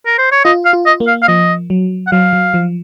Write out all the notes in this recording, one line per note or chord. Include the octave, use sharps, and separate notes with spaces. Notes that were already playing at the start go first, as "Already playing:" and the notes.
A#4
C5
C#5
F4 D#5
F5
F4
D#5
A#3
F5
F5
F3 D#5
F#3
F#5
F#3 F5
F#3
F3